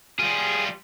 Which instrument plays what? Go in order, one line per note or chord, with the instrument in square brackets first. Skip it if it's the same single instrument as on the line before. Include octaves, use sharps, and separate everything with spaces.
[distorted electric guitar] G3 F4 [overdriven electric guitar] G#4